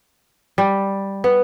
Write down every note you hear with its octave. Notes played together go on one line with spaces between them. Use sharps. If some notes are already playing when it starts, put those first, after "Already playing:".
G3
B3